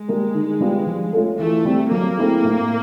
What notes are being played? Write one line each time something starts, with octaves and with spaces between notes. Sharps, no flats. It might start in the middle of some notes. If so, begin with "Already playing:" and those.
Already playing: G#3
G3 A#3
D#3
G3 B3 D4 F4
F3
A3 C#4 F4 A4
E3 A3
G3 C4
F#3 A#3
A3 C4 E4 G#4
A2